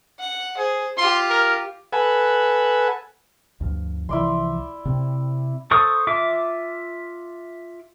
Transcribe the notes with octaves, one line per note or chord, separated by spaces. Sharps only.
F#5
G#4 C5
F4 G4 C6
A#4
A4 B4 F#5 G#5
D2 G2 F3
C2 E3 F3 E4 D5 C6
C3 C4
A4 C5 C#6 D#6
F4 E5 D6